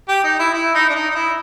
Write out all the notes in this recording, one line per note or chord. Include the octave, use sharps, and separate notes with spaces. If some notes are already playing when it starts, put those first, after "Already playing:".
G4
D#4
E4
E4
D#4
D4
D#4
D#4
E4